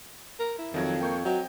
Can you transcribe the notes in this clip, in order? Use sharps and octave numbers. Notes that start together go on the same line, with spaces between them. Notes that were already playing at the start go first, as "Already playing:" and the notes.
A#4
E4
F2 D#3 F#3 G#6
A#3 G5 C#6 G6
F#3 C4 D#5 G5